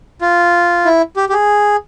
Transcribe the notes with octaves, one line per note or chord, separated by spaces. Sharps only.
F4
E4
G4
G4
G#4